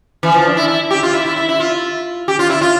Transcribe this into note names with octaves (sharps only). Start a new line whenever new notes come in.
E3
F3
D4
E4
E4
G4
F4
E4
E4
E4
E4
F4
G4
F4
E4
F4